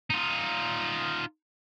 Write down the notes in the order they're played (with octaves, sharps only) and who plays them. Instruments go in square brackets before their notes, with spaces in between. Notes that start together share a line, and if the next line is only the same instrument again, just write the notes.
[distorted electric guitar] D#4 F4